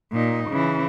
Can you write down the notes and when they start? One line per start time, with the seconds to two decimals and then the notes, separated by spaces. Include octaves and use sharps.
0.12 A#2 D#4
0.49 C#3 E3